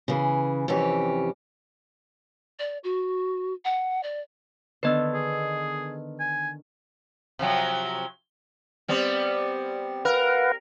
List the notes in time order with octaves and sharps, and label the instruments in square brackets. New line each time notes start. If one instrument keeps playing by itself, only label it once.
[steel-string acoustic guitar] C#3 E3 G#4
F2 C3 E3 C#4 G4
[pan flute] D5
F#4
F#5
D5
[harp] D3 D#3 B3 [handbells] B4 D#5 E6
[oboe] G#4
G#5
[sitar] C3 F3 F#3
G3 B3 C4
[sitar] A#4 [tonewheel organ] B4 F5 F#5